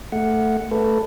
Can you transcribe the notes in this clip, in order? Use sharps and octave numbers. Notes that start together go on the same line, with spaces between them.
A3 F#5
A3 A4 B4